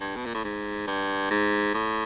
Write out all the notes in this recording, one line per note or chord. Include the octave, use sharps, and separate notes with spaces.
G2
B2
A#2
A2
G#2
G2
G#2
A2